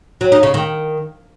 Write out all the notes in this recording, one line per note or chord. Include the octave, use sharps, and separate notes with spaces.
F#3
D#4
C#3
D#3